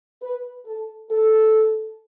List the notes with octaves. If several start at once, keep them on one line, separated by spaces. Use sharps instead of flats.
B4
A4
A4